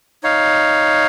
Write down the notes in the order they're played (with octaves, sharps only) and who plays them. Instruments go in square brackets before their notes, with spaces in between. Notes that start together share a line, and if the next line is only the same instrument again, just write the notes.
[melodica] D#4 C#5 F5